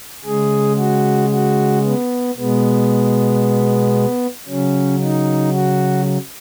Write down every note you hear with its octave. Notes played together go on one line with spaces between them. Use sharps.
C#3 G#3 G#4
F#4
F#4
B3
B2 G#3 B3
C#3 F#3 C#4
D#4
F#4